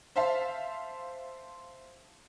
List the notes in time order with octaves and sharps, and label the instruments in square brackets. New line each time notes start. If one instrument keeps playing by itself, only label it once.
[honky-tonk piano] C5 E5 F5 A5